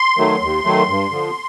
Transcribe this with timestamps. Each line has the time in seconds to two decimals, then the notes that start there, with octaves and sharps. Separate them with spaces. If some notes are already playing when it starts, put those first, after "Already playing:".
Already playing: C6
0.18 D#3 F#3 A3
0.42 D#2
0.64 D#3 F#3 A3
0.89 G2
1.11 D3 F3